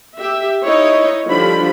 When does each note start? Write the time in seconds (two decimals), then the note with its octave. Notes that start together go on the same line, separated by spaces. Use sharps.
0.18 G4 E5
0.64 D#4 E4 C#5 D#5
1.27 D3 F3 G3 D4 B5